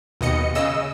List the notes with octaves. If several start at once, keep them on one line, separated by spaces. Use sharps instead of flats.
D#2 B2 D#5 C#7
C#3 D#5 E6